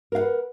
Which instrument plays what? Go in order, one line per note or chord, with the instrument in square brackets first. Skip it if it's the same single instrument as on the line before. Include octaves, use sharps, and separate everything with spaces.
[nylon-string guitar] A#4
F5
F#5
B4